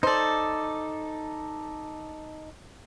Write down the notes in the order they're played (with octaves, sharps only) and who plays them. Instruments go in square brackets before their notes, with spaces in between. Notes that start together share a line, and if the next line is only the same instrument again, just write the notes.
[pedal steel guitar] D#4 A4 [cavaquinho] C5 D5